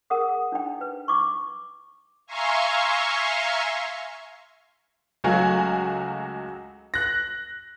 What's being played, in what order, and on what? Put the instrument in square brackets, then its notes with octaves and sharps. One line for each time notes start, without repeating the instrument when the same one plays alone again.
[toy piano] G#4 A#4 F#5 D#6
D4 D#4 G5
B4
C#6 D6
[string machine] E5 F5 G#5 A#5 C6 C#6
[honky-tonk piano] C#2 F#3 A3 F#4 F5 G#5
F#6 A#6